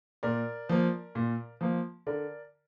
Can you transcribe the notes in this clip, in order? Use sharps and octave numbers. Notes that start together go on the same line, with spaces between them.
A#2 A#4 D5
F3 A#3
A#2
F3 A#3
D3 A#4 D5